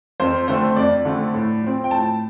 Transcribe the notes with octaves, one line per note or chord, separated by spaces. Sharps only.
F2 C5
D3 A3 C4 C5
F2 D5
D3 A3 C4
A2
F3 C4
G5
A2 A5